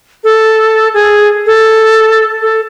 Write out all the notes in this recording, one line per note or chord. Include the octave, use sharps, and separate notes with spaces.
A4
G#4
A4
A4